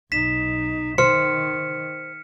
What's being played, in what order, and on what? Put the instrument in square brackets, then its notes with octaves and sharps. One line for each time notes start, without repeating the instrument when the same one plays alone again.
[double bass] B1 D#4 [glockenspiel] B6 E7
[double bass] D#3 [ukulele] C5 [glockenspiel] F6 C#7